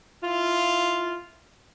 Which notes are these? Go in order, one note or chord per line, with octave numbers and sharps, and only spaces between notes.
E4 F4